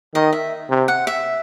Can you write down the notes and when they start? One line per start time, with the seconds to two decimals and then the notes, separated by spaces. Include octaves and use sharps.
0.15 D#3 D#5
0.33 E5
0.70 C3
0.88 F#5
1.07 E5